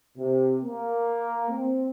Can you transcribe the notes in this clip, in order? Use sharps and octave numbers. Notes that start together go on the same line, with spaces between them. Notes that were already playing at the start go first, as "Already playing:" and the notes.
C3
A#3
C4